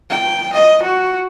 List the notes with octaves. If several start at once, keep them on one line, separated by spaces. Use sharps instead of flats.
G5
D#5
F#4